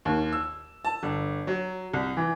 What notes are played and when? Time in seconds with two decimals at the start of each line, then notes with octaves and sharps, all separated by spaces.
0.05 D#2
0.32 E6
0.85 A5
1.03 G1
1.47 F#3
1.94 C2
2.17 E3